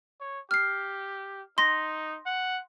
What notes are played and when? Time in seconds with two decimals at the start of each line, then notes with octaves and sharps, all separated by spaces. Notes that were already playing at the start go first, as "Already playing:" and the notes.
0.21 C#5
0.51 G4 F6 C7
1.58 D#4 C6 A#6
2.26 F#5